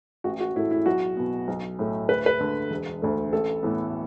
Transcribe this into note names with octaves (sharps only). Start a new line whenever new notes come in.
A1 F#4
F#4
A2 A3 E4
E4
B1 F#4
B2 B3
B1
A2 A3
D2 B4
B4
D3 A3
E1
D2 D3 A3
A1 A4
A2 E3 B3